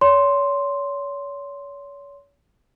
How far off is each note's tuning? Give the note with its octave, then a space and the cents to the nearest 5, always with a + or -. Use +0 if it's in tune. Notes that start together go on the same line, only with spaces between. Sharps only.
C#5 +35 C6 +0